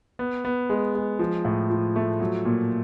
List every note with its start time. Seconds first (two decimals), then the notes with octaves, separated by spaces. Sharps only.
0.19 B3
0.45 B3
0.69 G#3
0.95 G#3
1.19 F3
1.45 A2
1.70 F3
1.96 A3
2.20 F#3
2.45 A#2